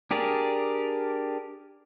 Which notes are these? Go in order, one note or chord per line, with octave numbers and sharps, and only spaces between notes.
D4 G4 G#4 A#4 D5